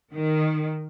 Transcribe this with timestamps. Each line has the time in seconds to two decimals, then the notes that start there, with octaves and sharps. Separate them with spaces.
0.14 D#3